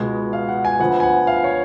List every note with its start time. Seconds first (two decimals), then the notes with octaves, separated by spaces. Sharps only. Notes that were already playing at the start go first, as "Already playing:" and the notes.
Already playing: C#2 B2 G#3 B3
0.33 F5
0.49 F#5
0.65 G#5
0.79 D2 D3 F3 B3 F#5
1.00 G#5
1.03 F#5
1.27 F5
1.44 C#5